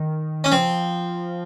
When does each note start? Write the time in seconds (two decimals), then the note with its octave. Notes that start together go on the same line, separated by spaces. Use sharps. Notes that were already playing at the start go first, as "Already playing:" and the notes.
Already playing: D#3
0.44 C#4
0.52 F3 C4